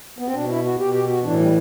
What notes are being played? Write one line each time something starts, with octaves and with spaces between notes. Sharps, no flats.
B3
C4
B2 D4
E4
F#4
B2 G4
G4
F#4
A2 E3 D4
G3